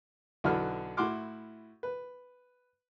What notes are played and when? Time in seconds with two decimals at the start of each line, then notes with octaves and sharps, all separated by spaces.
0.44 B1 D3 E3 F#3 B3 F6
0.97 A2 E4 F#4 C6 D6 F6
1.83 B4